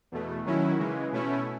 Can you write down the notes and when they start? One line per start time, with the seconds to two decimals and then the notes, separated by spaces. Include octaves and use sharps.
0.12 E2 B2 A3
0.45 D#3 F#3 C#4 E4
0.79 C#3 E3 G#3
1.12 B2 A3 C#4 E4